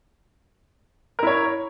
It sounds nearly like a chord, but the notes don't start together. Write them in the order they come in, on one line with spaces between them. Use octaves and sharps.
A#4 E4 C#5